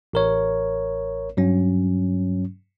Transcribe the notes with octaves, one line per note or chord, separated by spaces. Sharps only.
A1 A#4 C#5
G2 F#3 C#4